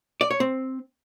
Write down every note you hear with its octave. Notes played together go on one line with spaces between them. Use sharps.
D5
C#5
C4